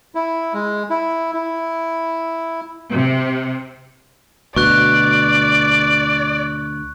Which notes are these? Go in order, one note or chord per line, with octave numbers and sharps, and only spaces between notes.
E4
G#3
E4
E4
C3
D2 B2 D5 C#6 F#6